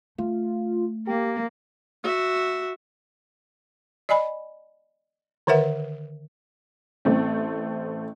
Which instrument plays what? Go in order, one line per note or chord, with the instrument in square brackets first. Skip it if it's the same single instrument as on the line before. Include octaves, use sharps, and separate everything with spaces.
[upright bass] A3 [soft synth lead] F4
[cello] A#3 [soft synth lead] G4
[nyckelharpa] F#4 E5
[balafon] D5 D#5 G#5 B5
D3 D#3 A#4 B4 E5 F#5
[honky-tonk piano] A1 A3 C4